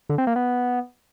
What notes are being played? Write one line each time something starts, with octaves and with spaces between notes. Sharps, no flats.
D3
C4
A#3
B3